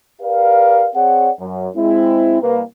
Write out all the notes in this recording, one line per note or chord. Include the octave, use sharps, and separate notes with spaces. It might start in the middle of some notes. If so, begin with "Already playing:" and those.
G4 A#4 B4 D5 F5
C4 G#4 C#5 D5 F#5
F#2
G#3 C4 E4
C2 A#3 B4